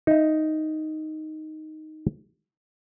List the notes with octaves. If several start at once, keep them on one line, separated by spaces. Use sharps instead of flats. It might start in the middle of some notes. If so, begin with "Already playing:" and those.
D#4 E5